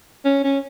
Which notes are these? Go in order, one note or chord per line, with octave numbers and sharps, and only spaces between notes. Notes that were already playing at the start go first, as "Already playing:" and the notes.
C#4
C#4